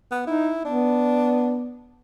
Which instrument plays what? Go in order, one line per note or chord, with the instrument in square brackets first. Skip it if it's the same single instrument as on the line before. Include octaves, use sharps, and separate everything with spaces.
[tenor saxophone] B3
[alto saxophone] D#4 [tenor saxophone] E4
[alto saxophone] B3 [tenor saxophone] D4